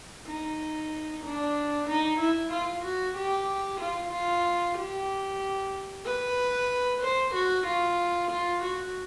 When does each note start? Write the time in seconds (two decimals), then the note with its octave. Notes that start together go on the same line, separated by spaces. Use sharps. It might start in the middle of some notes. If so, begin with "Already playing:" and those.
0.27 D#4
1.24 D4
1.88 D#4
2.20 E4
2.52 F4
2.84 F#4
3.17 G4
3.81 F4
4.13 F4
4.78 G4
6.06 B4
7.02 C5
7.35 F#4
7.67 F4
8.31 F4
8.63 F#4